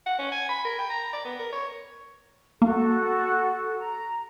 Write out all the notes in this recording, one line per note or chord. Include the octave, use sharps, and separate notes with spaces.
F#5
C#4
G#5
B5
A#4
G5
A#5
D5
B3
A#4
C#5
A#3 F#4 A4
A#5